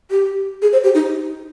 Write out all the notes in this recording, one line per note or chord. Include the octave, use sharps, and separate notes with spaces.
G4
G#4
C5
G4
D#4